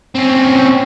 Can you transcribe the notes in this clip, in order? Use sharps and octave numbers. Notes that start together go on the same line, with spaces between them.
C4 C#4